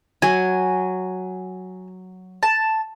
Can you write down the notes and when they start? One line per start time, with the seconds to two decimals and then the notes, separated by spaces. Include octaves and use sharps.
0.22 F#3 G#5
2.43 A5